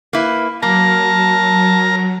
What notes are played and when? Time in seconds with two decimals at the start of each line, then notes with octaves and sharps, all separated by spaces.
0.13 A#3 E4 B4
0.63 F#3 A#3 A#4 A5 A#5